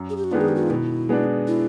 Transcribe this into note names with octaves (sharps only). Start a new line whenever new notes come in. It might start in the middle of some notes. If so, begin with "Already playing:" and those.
Already playing: F#2
G#4
G4
F#4
D#3 G#3 B3 D4 F4
G#4
G4
F#4
F4
B2 E4
G#3 B3 D4
E4